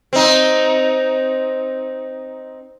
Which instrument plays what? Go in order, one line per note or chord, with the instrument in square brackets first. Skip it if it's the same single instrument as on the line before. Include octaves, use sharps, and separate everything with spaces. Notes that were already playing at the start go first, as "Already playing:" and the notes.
[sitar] C4 D#4